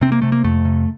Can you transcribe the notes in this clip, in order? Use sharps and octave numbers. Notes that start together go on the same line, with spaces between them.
C3 C4
A#3
C3 A3
A#3
F2 A3
C3